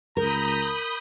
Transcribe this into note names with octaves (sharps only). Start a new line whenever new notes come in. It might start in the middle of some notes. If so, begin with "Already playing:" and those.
C#2 A#4 A#5 B5 D#6 G6